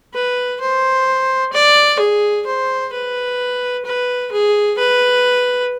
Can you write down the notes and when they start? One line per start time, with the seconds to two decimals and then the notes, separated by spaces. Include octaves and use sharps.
0.14 B4
0.60 C5
1.53 D5
2.00 G#4
2.46 C5
2.93 B4
3.86 B4
4.32 G#4
4.79 B4